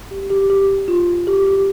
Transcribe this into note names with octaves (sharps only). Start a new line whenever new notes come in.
G4
G4
G4
F4
G4
G4